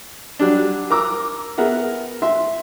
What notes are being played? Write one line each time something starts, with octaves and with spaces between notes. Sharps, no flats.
F#3 G3 D4
A#4 A#5 D6 E6
B3 G#4 A#4 E5 F#5
E5 C6